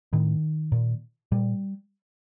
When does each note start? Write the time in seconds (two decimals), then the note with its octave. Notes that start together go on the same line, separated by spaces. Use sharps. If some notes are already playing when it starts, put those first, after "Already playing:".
0.13 A2 D#3
0.72 A#2
1.32 A#2 G3